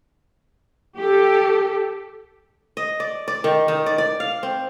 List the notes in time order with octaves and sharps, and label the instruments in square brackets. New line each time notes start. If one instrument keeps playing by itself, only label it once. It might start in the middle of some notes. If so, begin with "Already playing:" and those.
[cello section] G4 A4
[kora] D#5
D5
D5
D#3
D#3
D5
D5
F5
C4